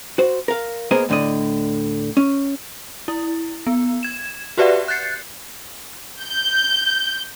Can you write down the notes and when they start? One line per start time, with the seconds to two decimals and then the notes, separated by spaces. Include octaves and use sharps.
0.18 F#4 C5
0.48 A#4 F5
0.91 A#3 B3 G#4 A#4 C5 D#5
1.09 D2 A2 D3 D5 D#5
2.17 C#4
3.08 E4
3.67 B3
4.03 G#6 E7
4.58 F#4 G4 B4 D5 E5 F#5
4.88 F#6 G6 A6 C7 C#7
6.23 G6